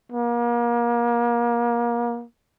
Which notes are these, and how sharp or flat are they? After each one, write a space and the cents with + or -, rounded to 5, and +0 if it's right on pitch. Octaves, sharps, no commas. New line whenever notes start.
A#3 +30